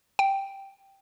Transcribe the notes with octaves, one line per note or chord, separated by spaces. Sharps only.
G5